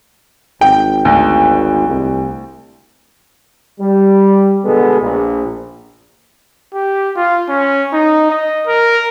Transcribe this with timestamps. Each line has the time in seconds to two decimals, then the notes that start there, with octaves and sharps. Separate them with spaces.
0.61 G#1 G5
1.05 D2
1.88 C2
3.80 G3
4.63 B2 D3 G#3 B3 G#4 A4
5.00 A#1
6.74 G4
7.16 F4
7.49 C#4
7.93 D#4
8.30 D#5
8.67 A#4